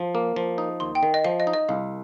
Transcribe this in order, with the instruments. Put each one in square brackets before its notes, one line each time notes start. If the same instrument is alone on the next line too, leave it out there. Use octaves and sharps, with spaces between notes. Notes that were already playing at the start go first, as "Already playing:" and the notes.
Already playing: [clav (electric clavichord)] F3
A#3
F3
D#4
[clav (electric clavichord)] D#2 [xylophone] C6
[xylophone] G5
[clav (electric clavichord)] D#3
[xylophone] D#5
[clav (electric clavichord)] F3 [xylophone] F5
[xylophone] D#5
[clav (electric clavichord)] D#4
[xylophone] D#5
[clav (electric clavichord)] C2 [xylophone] F5